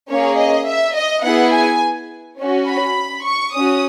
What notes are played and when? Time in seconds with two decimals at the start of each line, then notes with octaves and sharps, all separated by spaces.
0.10 A#3 C#4 G#4 C#5
0.39 D#5
0.67 E5
0.96 D#5
1.25 B3 E4 G#4 F#5
1.54 G#5
2.39 C#4 F#4
2.68 B5
3.26 C#6
3.54 C#4 F#4 D#6